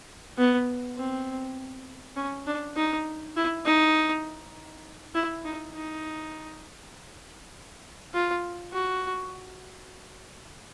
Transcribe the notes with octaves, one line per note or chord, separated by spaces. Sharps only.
B3
C4
C#4
D4
D#4
E4
D#4
E4
D#4
D#4
F4
F#4